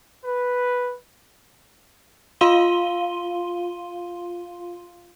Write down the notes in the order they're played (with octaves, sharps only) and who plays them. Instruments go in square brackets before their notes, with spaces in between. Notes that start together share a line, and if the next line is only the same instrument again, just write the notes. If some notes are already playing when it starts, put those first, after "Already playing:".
[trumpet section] B4
[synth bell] F4 F5 C6 D#7 G7